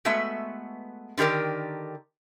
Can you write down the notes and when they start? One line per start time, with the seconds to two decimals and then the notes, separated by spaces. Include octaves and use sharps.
0.05 G#3 A3 B3 F#4 E5
1.17 D3 D#3 G4 A#4 D5